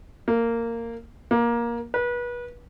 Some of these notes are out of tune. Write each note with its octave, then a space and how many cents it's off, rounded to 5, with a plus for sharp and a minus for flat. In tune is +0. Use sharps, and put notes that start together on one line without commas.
A#3 -15
A#3 +15
B4 -30